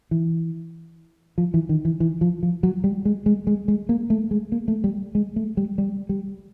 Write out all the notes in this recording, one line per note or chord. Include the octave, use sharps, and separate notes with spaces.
E3
F3
E3
D#3
E3
E3
F3
F3
F#3
G3
G#3
G#3
G#3
G#3
A#3
A3
G#3
A#3
A3
G3
G#3
A3
G3
G3
G3